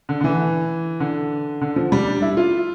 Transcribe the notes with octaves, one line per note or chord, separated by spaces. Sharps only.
D3
D3
E3
D3
D3
F3
G3
D4
E4
F4